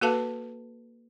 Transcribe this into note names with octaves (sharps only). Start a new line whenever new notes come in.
A#3 F#4 A4 B4 F5 A5